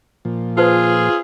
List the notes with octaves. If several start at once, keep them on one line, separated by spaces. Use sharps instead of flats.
A#2 F3
F4 G#4 B4 C5 A5